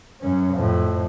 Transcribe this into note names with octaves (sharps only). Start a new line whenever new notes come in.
F#2 C#4
F2 A2